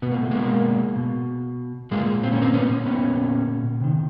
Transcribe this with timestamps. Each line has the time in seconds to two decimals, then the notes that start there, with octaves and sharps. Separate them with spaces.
0.02 B2 B3
0.11 A#3
0.21 A3
0.31 G#3 A#3
0.96 B2
1.91 A#2 G#3 A#3
2.23 C4
2.32 C#4
2.42 A#3 C4
2.54 B3 C#4
2.86 A#2 B3 C#4
3.81 C3 D#3